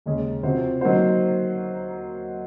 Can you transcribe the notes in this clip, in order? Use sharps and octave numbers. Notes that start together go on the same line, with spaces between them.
D#2 C#3 G#3 C#4 G#4
C3 F3 C4 F#4 C5
F#3 A#3 D#4 F#4 C5